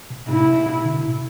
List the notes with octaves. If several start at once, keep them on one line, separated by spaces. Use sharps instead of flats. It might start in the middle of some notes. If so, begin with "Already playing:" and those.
B2
A2 C3 E4
B2
B2
B2 D3
A2 C3